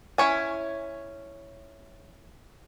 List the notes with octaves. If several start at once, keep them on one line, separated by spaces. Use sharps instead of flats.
C#4 E4 C#5 G#5